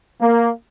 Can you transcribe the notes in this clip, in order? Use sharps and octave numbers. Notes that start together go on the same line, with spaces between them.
A#3